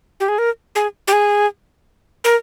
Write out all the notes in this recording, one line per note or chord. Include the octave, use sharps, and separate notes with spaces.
G4
G#4
A#4
G#4
G4
G#4
A#4